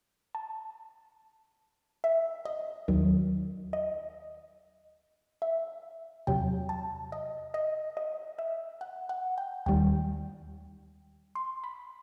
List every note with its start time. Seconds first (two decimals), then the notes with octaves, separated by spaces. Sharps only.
0.35 A5
2.04 E5
2.45 D#5
2.88 D#2 D#3 F#3
3.73 D#5
5.42 E5
6.27 E2 C3 F#3 G5
6.69 A5
7.12 D#5
7.54 D#5
7.97 D#5
8.39 E5
8.81 F#5
9.09 F#5
9.38 G5
9.66 D#2 D#3 G3 G5
11.35 C6
11.64 B5